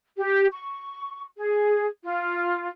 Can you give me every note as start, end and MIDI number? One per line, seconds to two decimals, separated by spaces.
0.18 0.46 67
0.51 1.22 85
1.38 1.85 68
2.03 2.67 65